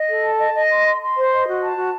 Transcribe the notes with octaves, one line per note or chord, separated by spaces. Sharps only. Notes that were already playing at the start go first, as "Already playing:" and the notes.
Already playing: D#5
A4
A5
D#5
D#5
C6
C6
C6
C5
D#5
F#4
A5
F#4